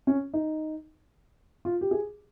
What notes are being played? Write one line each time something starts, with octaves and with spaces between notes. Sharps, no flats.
C#4
D#4
F4
G4
G#4